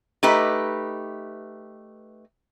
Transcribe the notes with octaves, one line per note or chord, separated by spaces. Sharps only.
A3 D#4 G4 B4